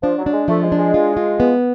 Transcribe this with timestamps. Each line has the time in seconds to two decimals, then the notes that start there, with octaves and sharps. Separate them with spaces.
0.03 F3 D4
0.19 F#3
0.26 D4
0.33 G#3
0.48 F3 A3
0.63 G#3
0.72 D4
0.79 G#3
0.94 F4
1.17 F4
1.40 B3